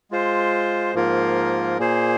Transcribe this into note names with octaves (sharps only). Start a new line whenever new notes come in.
G#3 F4 C5
G#2 F3 A#3 F4 A#4
A#2 A#3 G#4 C5